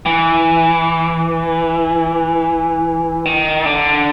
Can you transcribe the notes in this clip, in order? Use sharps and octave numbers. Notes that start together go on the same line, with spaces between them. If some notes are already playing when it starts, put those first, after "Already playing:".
E3
D#3
D3